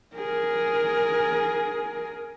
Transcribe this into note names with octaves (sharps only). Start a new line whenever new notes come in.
G#4 A#4